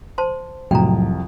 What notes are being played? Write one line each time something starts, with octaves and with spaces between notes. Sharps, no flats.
C5 A5 C6
C2 F2 A2 C3 F#3 G5 A#5